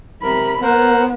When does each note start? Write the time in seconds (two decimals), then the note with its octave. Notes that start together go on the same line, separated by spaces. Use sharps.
0.23 C3 A#4 B5
0.62 B3 A#4 C5 F#5